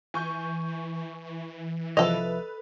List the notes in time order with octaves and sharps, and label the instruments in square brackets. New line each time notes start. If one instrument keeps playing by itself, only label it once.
[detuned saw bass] E3 [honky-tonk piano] G#5 C#6 G6
[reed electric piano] C2 F3 E5 [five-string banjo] A4 D#5 [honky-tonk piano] B4 F7